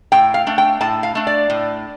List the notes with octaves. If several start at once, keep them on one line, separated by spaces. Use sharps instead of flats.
A2 G5
F5
A3 D4
G5
A2 A5
F5
A3 D4
D5
A2